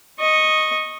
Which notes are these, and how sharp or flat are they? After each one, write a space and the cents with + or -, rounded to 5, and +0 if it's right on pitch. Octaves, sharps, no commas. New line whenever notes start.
D#5 +0 C#6 -15